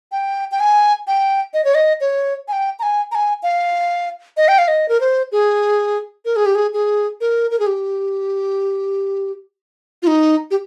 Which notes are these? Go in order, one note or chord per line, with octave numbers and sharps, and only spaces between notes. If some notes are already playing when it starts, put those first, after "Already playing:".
G5
G5
G#5
G5
D#5
C#5
D#5
C#5
G#5
G5
A#5
G#5
A#5
G#5
F5
D#5
G5
F5
D#5
A#4
C5
G#4
A#4
G#4
G4
G#4
G#4
A#4
A#4
G#4
G4
F4
D#4
G4